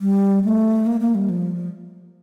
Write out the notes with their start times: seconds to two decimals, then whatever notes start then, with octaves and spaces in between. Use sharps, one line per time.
0.01 G3
0.45 A3
0.86 A#3
1.01 A#3
1.15 G3
1.30 F3